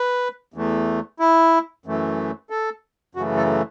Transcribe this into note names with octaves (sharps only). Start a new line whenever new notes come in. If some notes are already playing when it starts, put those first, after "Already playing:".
Already playing: B4
E2 E3 A3
E4
F#2 E3 A3
A4
F#2 C#3 E3 A3 F#4
A4